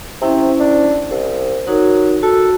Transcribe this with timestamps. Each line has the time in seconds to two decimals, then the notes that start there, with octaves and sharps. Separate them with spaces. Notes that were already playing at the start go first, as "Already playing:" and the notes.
0.21 C3 C#4 E4 C5
0.60 D4
1.11 C2 C5
1.67 F#3 D#4 F#4 A#4
2.23 F#4 A4